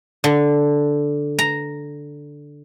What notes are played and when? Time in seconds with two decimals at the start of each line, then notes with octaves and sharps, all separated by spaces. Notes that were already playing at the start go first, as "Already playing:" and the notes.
0.24 D3
1.39 A#5